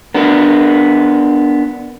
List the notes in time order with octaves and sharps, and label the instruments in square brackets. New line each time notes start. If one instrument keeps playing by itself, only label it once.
[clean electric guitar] B3 D4 A#4